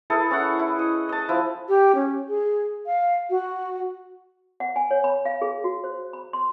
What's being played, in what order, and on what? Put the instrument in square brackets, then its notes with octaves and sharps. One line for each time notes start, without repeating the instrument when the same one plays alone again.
[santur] E4 G#4 A4 B4
C#4 E4 F#5
E4
D#5
D#5 A5
F3 E4
[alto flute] G4
C#4
G#4
F5
F#4
[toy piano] F#5
G#5
C#5
B5
F5
G#4
F#4
C5
B5
C6